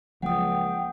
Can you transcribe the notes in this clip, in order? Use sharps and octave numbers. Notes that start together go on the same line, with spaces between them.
C#2 F3 F#3 A#3 F#5 G5 D#6